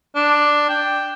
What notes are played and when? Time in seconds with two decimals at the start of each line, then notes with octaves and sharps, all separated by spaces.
0.16 D4
0.69 G5